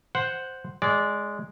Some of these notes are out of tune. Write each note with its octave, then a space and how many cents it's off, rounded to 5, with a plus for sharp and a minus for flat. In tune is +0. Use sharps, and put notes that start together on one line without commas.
C5 +0 F#5 +0
G#3 +0 D5 -20